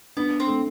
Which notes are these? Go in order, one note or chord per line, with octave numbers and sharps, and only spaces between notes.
B3 D4
C4
A3